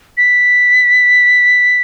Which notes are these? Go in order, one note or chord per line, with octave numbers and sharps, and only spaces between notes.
B6